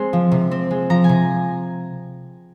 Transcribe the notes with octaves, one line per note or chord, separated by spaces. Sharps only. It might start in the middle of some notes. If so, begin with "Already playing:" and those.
Already playing: G#3 C4 C6
F3
C3
C4
G#3
F3 A#5
G#5
C3